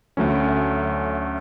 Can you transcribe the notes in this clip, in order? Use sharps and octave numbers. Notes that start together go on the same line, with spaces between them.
D2 D3 F#3 A3 C#4